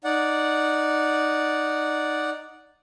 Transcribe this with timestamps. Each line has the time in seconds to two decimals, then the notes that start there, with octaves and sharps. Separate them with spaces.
0.04 D#4 D5 F#5